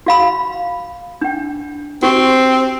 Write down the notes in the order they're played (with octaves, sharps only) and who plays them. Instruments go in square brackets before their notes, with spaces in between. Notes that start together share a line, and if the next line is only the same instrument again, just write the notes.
[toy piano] F#4 F5 B5
D4 G5
[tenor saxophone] C4 [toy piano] F#4 G4